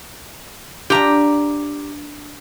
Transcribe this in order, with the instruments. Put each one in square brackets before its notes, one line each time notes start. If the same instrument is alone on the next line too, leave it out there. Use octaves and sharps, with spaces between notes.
[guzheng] D4 F4 [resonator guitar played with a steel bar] G4 A#5